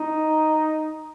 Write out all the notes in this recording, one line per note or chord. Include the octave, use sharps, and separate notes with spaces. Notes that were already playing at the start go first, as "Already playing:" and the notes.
Already playing: D#4